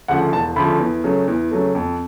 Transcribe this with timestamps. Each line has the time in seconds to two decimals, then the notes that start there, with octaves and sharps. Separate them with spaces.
0.08 D2 C#3 F3 A3 F#5
0.32 E1 A5
0.56 D2 C#3 F3 A3 B5
0.80 E2
1.04 C#3 F#3 A3
1.27 E2
1.51 C#3 F#3 A3
1.75 F2